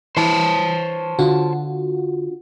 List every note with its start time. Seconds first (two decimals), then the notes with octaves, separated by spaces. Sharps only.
0.17 E3 C5 C#5 A5
1.19 D3 F4 F#4